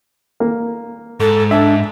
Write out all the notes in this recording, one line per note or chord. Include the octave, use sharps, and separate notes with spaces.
A#3
G#2 A4
D4 E5